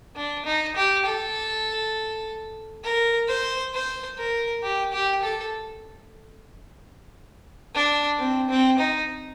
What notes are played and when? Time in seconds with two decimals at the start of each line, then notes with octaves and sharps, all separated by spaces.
0.16 D4
0.45 D#4
0.76 G4
1.06 A4
2.84 A#4
3.28 C5
3.74 C5
4.18 A#4
4.63 G4
4.93 G4
5.23 A4
7.75 D4
8.19 C4
8.49 C4
8.79 D#4